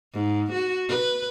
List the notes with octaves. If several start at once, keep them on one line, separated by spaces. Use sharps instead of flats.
G#2
F#4
B4